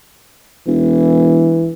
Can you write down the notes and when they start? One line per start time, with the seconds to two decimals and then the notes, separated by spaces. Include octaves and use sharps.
0.67 E1 E3